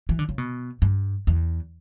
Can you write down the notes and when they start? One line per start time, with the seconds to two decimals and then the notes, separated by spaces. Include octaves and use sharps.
0.09 E3
0.19 D3
0.29 C#3
0.38 B2
0.82 G2
1.27 E2